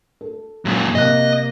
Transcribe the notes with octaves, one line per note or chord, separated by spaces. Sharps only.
A4
F#2 A#2
C3 A#3 D#5 F#6